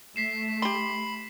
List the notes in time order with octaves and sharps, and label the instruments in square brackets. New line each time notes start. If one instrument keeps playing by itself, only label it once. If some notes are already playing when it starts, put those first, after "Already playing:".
[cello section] A3 [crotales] B6 C7 E7
[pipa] G4 C6 [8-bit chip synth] B5